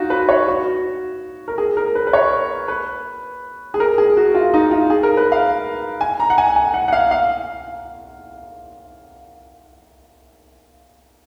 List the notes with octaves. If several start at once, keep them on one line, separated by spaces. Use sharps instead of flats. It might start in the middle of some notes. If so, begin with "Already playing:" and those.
Already playing: D#4 F4 F#4
B4
C#5
F#4
A#4
G#4
A#4
B4
B4
C#5
B4
G#4
A#4
G#4
F#4
F4
D#4
F4
G#4
A#4
B4
F5
G#5
A#5
F#5
G#5
G#5
F#5
F#5
F5
F5